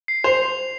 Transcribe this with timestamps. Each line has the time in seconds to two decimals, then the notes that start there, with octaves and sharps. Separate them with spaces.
0.08 C7
0.24 C5 F7